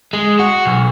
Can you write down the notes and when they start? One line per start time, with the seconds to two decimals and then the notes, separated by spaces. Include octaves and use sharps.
0.13 G#3
0.39 F#4
0.65 B1